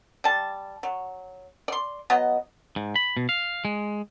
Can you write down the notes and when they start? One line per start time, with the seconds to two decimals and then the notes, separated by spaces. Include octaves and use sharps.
0.24 G3 A5
0.83 F#3
1.68 D5 C6
2.10 F#3 B3 D#5
2.76 G#2
2.96 B5
3.17 B2
3.29 F5
3.65 G#3